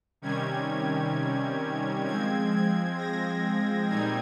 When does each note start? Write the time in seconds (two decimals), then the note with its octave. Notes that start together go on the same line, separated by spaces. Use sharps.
0.22 C3 D#3 G3 C#4 G#6
2.06 F3 G#3 C4 G#6
2.52 G#6
2.97 A#6
3.89 A#2 G3 C4 D#4 G#6